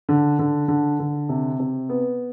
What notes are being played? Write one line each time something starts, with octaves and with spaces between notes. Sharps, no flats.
D3
D3
D3
D3
C3
C3
B3